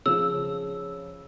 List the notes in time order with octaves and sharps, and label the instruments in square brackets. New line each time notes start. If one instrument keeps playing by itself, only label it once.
[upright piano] C#3 F3 [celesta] E6